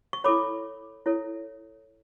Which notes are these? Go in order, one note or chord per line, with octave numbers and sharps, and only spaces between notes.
C#6
E4 A4 C#5 B5 D6
E4 A4 C#5